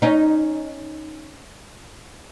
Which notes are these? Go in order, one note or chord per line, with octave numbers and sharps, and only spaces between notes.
C#4 D#4